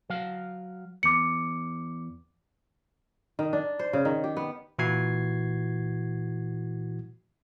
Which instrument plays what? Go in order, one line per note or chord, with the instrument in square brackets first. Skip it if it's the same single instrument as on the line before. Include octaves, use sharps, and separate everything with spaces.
[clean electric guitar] F#3 F5
[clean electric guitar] E2 [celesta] D6 C#7
[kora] D#3
D4
C5
C#3
D#3
G4
B3
[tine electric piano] A#2 E3 E4 F#4 G#6 C7